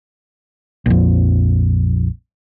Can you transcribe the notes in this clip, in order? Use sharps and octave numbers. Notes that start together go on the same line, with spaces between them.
A#1 F2